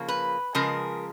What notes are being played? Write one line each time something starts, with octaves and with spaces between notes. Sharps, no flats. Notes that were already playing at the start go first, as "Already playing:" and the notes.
Already playing: C#3 F3 A#3
B4
C#3 F3 G#3 A#4